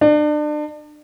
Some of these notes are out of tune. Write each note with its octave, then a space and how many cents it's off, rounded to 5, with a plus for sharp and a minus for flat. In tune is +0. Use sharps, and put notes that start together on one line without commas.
D4 +35